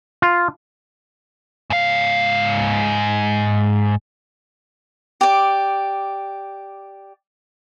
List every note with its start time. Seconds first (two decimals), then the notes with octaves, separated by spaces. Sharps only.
0.22 F4
1.70 G#2 F5
5.21 G4 D5